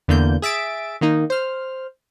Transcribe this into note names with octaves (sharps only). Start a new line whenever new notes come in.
E2 D3 A#3 G6
G#4 E5 A6 D7
D#3 A#3 D#4
C5 F6